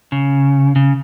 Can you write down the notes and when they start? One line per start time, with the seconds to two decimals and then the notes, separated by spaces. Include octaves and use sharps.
0.12 C#3
0.76 C#3